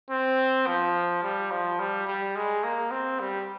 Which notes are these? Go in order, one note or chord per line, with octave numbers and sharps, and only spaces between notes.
C4
F3
G3
F3
G3
G3
G#3
A#3
C4
G3